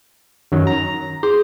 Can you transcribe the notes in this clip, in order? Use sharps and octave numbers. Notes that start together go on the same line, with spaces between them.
F#2 D#3 F#3
A#5
G#4 C5